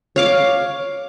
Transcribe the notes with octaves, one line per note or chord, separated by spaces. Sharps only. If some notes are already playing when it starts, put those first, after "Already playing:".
C#5 F5 D6